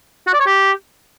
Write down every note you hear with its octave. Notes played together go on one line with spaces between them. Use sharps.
F#4
D5
C#5
G4